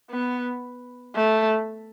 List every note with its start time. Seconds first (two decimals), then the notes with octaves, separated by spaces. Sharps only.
0.10 B3
1.15 A3